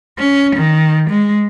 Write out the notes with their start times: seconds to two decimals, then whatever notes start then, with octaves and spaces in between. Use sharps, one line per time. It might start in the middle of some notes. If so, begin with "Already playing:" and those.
0.19 C#4
0.56 D#3
1.10 G#3